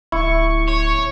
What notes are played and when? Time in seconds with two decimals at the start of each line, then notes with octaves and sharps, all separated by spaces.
0.12 D1 E4 C#6
0.68 C#5